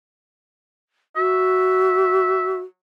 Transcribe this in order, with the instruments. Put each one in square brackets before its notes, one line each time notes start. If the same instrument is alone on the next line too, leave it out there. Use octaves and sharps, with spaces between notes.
[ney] F#4 [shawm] E5